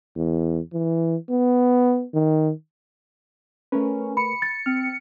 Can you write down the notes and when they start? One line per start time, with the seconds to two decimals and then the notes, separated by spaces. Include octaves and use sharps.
0.16 E2
0.73 E3
1.30 B3
2.14 D#3
3.72 A3 C#4 A#4 B4
4.17 B5 C#7
4.42 A6
4.66 C4 F6